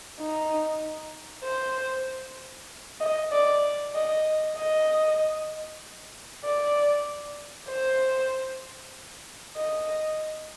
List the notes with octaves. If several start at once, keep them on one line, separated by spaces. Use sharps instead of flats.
D#4
C5
D#5
D5
D#5
D#5
D5
C5
D#5